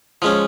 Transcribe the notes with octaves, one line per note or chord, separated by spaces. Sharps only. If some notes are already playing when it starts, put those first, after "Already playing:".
F3 G#3 C#4